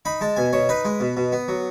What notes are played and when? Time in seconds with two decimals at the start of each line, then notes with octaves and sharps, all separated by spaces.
0.05 D#4 B5
0.21 G#3 A5
0.36 B2 G#5
0.53 B2 C#5
0.69 D#4 B4
0.85 G#3
1.00 B2
1.17 B2
1.32 B3
1.48 F#3